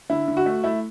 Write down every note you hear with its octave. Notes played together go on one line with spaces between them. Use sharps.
D3 E4
D3
F#4
A3
A3 E4